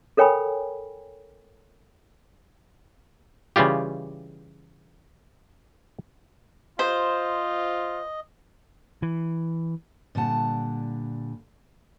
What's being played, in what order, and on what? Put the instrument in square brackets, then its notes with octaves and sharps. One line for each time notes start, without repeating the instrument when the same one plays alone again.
[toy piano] A4 A#4 C#5 G5 G#5 B5
[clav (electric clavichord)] C#3 E3 G3 F4 G4
[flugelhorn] F4 [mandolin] C5 [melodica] D#5
[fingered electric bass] E3
[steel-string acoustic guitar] A#2 D3 G3 F#5 A5